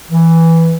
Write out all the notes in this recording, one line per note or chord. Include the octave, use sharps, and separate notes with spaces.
E3